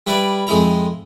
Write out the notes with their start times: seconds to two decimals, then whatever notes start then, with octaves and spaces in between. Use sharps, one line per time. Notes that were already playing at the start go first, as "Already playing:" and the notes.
0.07 G3 E4 B4 D5
0.47 F2 G#3 D#4 E4 A#5